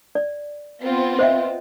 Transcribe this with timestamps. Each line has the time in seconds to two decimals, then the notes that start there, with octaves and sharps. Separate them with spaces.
0.15 D5
0.84 B3 C4 F4
1.19 C5 D#5 E5